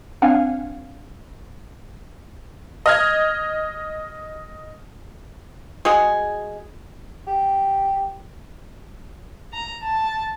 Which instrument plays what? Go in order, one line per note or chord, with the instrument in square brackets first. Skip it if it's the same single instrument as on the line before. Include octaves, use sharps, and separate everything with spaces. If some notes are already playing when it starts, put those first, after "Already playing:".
[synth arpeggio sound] C4 D4 F5 F#5 G#5
[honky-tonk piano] D#5 F6 G#6
[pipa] G#3 F#4 G#4
[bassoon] G4
[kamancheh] A#5
A5